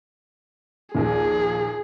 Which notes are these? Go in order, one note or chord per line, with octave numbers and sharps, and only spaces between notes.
A#1 D#2 A#2 G#4